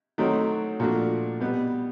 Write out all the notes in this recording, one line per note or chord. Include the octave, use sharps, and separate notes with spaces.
D#3 F#3 A3 C4
A#2 F3 A3 D4 F#4
B2 G3 B3